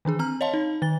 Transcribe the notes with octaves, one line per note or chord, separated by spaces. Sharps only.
D#3 E3 D4 G#4
C4 A#5 F6
C#5 D#5 F5 A5 C6
D#4
D#3 A6 G7